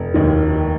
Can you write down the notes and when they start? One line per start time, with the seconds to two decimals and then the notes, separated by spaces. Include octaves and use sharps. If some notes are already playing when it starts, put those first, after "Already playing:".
Already playing: F1
0.14 D#2 D#3